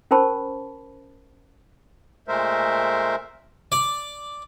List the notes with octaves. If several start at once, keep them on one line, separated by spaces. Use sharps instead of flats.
C#4 A#4 C5 A5 B5 C#6
A#2 G#3 A3 A#4 C5 E5
D5